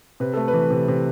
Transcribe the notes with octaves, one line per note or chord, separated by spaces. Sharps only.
C3 B4
A3 A4
B4
E3
C3
C3